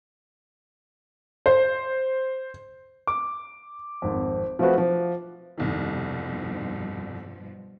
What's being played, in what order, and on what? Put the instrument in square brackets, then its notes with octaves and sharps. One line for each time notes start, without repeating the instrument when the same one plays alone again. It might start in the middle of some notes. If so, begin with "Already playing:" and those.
[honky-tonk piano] C5
[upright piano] D6
G#1 F2
F3 A3 C4 F4 F#4 B4
F3
[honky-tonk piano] F1 C2 D#3 [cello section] G2 B2 F3